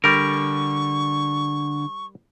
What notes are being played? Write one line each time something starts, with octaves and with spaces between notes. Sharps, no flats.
D3 G3 A#4 C#6